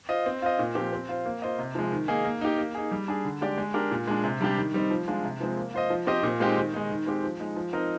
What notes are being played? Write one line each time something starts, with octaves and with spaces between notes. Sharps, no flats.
F4 C5 D#5
C4
F4 C5 D#5
A#2
F3 C4 G4
C4
F4 C5
A#3
F4 C5 D#5
C3
F3 G#3
D#3
A#3 D#4 G#4
A#3
D#4 G4
A#3
D#4 G#4
G3
D4 G#4
D3
G#3 D4 G4 D5
G#3
D4 G4 A#4
A#2
G#3 D4
C3
G3 D4 G4
D#3
G3 C4 D#4
F3
G#3 D4 F4
C3
F3 G#3 C4
A#3
F4 C5 D#5
F3
C4 G4 C5 D#5
A#2
G#3 C4 D#4 G4
D#3
G#3 D#4
D#3
G#3 C4 G4
F3
G#3 D#4
F3
C4 D#4 A#4 D#5